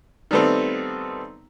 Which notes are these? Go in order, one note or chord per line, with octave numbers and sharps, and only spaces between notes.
D#3 G3 A3 B3 C4